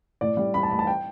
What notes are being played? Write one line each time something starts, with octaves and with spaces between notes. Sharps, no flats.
A2 D5
G3
G3 B5
A5
A1 B5
A5
G5